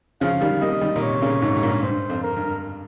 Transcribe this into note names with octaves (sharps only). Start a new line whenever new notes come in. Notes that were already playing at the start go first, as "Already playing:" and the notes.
C#3 F3 F5
D#3 G3
G3 A#3 D#5
D#3 G3
A#2
C#5
C3
A#2 C#3
G#2 C3 C#5
G#2
G2 A#2
G2 C5
F2
A#4
G2